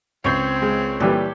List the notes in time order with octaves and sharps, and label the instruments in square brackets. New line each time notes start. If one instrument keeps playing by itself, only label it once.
[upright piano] C#2 G6 C7 [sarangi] C4 [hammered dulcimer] C#5
[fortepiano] G#3
[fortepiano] A#2 E3 G3 [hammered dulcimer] G4 A4